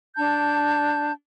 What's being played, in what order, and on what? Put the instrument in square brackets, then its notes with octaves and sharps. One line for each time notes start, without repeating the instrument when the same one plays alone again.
[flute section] D4 A5 G6